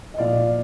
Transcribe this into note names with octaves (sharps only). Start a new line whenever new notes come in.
D#5
A#2 F3 D5 F5